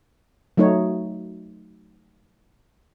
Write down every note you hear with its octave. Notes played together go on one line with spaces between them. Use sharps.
F#3 A3 D#4 F#4 C#5